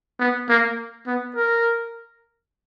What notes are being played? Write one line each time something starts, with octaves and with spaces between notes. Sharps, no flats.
B3
A#3
B3
A#4